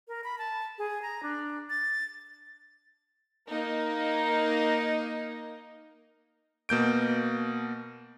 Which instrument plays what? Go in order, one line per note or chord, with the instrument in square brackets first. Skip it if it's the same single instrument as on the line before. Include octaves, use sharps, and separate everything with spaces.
[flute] A#4
B5
A5
G#4
A#5
D4
A6
[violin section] A#3 D#4
[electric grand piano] B2 A#3 G6 D7